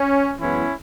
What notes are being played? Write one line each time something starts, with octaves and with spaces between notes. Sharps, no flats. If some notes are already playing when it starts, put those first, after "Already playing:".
Already playing: C#4
F#2 E3 G#3 B3 C#4 E4